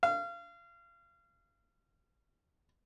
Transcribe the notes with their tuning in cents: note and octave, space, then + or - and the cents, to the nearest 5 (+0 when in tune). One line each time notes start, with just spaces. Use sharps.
F5 -30